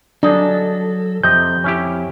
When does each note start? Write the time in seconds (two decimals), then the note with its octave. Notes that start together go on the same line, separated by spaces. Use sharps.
0.23 F#3 D4 D#4 G#4 A4
1.24 F2 C3 D#5 G6
1.64 C#4 E4 G4